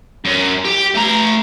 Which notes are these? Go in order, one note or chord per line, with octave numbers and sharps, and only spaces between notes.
F#2
G4
A3 A#5